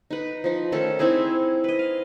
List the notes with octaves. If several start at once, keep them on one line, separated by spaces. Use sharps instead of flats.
D#4 B4
F3 D#4
D#3 A3 C#4 A4
C4 D#4 E4 G#4
B4 D#5
F5